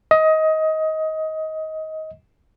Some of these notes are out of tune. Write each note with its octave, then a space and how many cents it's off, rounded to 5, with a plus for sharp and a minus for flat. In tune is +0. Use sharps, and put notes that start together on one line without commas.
D#5 +20